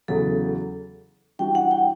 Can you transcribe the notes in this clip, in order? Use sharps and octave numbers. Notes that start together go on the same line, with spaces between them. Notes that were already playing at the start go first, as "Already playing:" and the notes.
E2 C#3 F#3 A4
E3 G3 D4 F#4 G5
F#5
G5